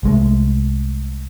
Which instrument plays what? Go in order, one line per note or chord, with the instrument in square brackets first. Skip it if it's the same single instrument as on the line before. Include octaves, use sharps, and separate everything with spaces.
[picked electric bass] C2 G#3 A3